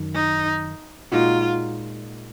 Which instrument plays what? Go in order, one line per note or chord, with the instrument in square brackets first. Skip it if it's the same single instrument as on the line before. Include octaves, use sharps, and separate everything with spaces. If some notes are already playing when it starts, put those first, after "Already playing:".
Already playing: [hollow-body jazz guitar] F#2 D#3
[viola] D#4
[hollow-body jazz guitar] A#2 G#3 D#4 F#4 [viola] F4